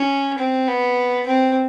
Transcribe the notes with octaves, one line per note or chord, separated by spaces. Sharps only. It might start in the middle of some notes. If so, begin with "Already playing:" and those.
Already playing: C#4
C4
B3
C4